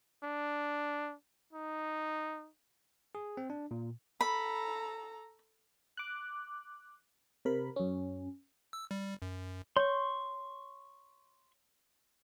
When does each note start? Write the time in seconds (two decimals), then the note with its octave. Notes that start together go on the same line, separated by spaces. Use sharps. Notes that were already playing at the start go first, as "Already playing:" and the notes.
0.23 D4
1.53 D#4
3.15 G#4
3.37 C4
3.50 D4
3.71 A#2
4.21 A4 A#5 B5
5.97 D6 F#6
7.45 C3 A#4 B5
7.76 F#2 C#4
8.73 E6
8.91 G3
9.22 F#2
9.77 C#5 C6 C#6